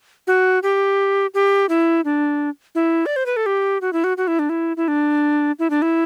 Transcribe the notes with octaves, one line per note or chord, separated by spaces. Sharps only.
F#4
G4
G4
E4
D4
E4
D5
C5
B4
A4
G4
F#4
E4
F#4
F#4
E4
D4
E4
E4
D4
E4
D4
E4